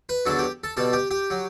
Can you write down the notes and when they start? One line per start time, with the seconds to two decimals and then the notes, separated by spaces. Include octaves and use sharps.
0.09 B4
0.26 E2 D3 F#3 A4
0.39 G4
0.64 A4
0.77 B2 G3 A4
0.93 G4
1.11 G4
1.30 F#3